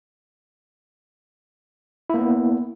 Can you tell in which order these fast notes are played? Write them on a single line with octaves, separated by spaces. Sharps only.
E4 A#3 B3